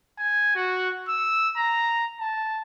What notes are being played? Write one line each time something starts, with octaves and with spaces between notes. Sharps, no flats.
G#5
F#4
E6
A#5
A5